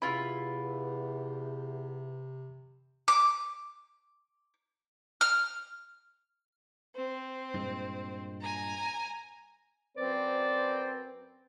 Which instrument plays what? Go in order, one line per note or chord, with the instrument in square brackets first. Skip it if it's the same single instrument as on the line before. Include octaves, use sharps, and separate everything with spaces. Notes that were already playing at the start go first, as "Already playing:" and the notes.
[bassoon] E2 [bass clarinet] C3 [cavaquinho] E4 F4 [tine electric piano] B5
[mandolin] D6
F6
[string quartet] C4
[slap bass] G2 A#2 G#3
[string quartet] G#5 A#5
[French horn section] F#2 B4 C5 [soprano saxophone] C4 [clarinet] D5